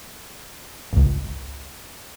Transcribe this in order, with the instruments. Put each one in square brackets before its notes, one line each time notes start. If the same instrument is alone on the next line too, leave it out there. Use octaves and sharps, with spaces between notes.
[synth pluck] G#1 C#2